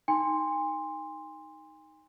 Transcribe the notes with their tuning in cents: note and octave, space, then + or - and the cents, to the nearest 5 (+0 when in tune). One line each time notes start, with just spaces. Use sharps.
D#4 +0 G#5 -40 C6 +0